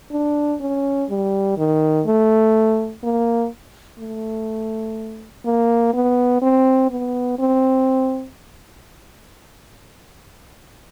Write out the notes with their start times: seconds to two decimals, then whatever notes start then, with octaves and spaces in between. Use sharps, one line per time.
0.12 D4
0.61 C#4
1.09 G3
1.57 D#3
2.06 A3
3.03 A#3
3.99 A3
5.45 A#3
5.93 B3
6.42 C4
6.90 B3
7.39 C4